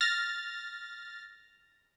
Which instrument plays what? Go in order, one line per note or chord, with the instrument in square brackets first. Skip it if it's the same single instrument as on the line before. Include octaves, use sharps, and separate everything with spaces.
[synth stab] F6 A6 A#6